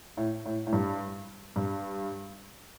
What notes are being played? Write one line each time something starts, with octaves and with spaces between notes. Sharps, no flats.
A2
A2
A2
G2
G2